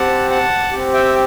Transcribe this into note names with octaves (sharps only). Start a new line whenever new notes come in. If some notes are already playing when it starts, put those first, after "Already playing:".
Already playing: C4 G4 F#5 A5
F#5 A5
C4 G4
E5 G5